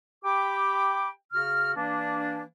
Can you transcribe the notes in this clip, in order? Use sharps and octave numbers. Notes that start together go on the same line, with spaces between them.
G4 G5 B5 D6
C#3 F#4 F6
E3 A#3 D4